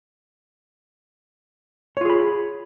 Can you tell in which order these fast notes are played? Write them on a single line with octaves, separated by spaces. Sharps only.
C#5 F4 G#4 B5